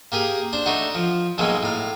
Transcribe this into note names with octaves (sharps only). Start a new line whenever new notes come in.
A#3 G4 G#4 A#4
D4 C5
A3 D4 D#4 F#4
F3
B1 B2 F#3 G#3 A#3
A2 F5